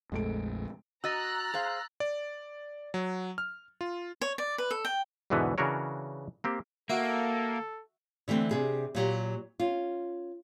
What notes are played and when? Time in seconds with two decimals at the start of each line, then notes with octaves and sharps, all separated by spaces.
0.12 A#1 F2 G#3 A3 D7
1.04 F#4 D#5 A#5 E6 F#6 A6 A#6
1.54 G#4 C5 F5
2.00 D5
2.94 F#3
3.38 F6
3.81 F4
4.21 C#5
4.38 D5
4.58 B4
4.71 A4
4.85 G5
5.30 E2 G#2 B2 D3 E3 B3
5.58 C#3 E3 D4 F#4 A#4 C#5
6.44 A#3 C4 G4
6.90 A#3 F#4 A4 E5
8.28 D3 E3 A3 C4
8.51 C3 D4 G#4
8.95 A#2 F#3 G4
9.60 C#4 F4